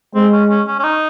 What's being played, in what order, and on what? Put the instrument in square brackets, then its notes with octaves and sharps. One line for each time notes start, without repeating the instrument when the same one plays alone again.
[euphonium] G#3 [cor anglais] C4
[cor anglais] C#4
C#4
C#4
C#4
D#4